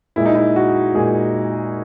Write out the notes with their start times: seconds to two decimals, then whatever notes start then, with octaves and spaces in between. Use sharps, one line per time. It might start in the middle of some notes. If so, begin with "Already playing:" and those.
0.16 A#2 G#3 E4
0.26 D#4
0.35 E4
0.56 F#4
0.95 A#2 G#3 G#4